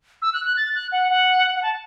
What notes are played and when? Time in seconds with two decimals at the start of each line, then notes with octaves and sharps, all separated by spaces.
0.22 E6
0.33 F#6
0.45 F#6
0.57 A6
0.75 F#6
0.92 F#5
1.10 F#5
1.56 F#5
1.63 A5